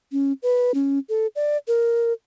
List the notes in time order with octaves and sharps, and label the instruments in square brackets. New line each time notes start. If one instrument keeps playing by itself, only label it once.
[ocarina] C#4
B4
C#4
A4
D5
A#4